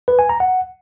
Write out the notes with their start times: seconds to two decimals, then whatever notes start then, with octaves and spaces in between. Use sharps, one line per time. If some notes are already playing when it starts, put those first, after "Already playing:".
0.08 B4
0.19 G#5
0.29 A#5
0.40 F#5